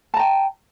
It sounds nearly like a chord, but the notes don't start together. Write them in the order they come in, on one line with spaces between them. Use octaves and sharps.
A5 A#5 G5